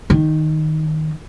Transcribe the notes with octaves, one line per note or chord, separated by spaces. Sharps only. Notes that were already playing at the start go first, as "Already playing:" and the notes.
D#3